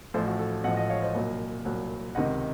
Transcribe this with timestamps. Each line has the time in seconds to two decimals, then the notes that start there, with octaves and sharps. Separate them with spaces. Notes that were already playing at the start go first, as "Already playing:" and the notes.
0.14 A1 A2 F3 A4 C5
0.26 F#4
0.39 A4
0.64 A1 A2 F3 D#5 F#5
0.77 D#5 F#5
0.89 C#5 F5
1.02 C5 D#5
1.14 C2 A#2 F#3
1.65 C2 A#2 F#3
2.15 C#2 C3 D#3 D#5 F#5